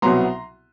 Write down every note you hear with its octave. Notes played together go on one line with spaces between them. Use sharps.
C2 B2 F#3 B3 A#5 C6